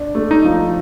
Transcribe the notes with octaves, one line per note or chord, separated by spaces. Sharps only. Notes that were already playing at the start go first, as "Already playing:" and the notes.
Already playing: D4
A3
D#4
F3